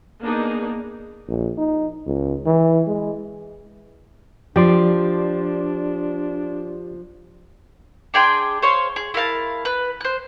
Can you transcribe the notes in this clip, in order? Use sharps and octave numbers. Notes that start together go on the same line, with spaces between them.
A#3 B3 D4 D#4 G#4
A#1
D#4
C#2
E3
G#3
F3 D4 G4 D5 C6
D4 G#4 G5 C6
C5 C#5 F5 C6
G#4
E4 A#4 F5 A5
B4
C5 F#6